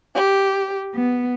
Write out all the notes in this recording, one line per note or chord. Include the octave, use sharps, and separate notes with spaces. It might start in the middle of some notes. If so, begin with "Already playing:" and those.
G4
B3